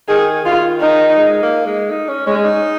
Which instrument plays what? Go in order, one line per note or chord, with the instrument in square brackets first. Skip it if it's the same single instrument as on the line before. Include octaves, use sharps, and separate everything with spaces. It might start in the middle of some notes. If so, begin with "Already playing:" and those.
[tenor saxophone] D#3 [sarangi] G#4
[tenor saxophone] D#3 [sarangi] F4
[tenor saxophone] D#3 [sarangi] D#4
[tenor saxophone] G#3
A#3
G#3
D#4
C#4
[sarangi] G#3 [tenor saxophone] C#4
[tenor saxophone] D#4